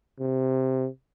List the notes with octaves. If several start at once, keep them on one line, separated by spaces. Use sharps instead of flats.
C3